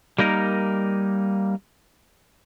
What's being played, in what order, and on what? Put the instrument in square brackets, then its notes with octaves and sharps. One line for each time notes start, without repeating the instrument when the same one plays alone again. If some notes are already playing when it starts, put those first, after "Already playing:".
[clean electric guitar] G3 A#3 D#4 A#4